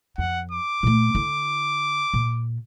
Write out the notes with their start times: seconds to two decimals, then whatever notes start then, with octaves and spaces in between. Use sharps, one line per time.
0.18 F2 F#5
0.51 D6
0.83 A#2 A3
1.15 D3 E4
2.14 A#2